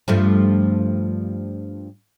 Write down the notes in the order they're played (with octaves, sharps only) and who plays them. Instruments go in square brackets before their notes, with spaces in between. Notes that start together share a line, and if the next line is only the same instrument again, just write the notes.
[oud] G2 F3 A3